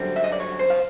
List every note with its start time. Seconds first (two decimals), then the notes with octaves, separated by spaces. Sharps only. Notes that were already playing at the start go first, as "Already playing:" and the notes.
Already playing: F#2 D3 G3 C4
0.16 E5
0.24 D#5
0.32 D5
0.40 C#5
0.59 C5
0.70 F5